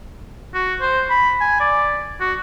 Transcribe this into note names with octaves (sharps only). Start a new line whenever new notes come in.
F#4
C5
B5
G#5
D5
F#4